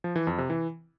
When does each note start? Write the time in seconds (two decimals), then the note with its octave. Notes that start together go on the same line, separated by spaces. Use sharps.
0.04 F3
0.16 E3
0.27 F2
0.38 C3
0.50 E3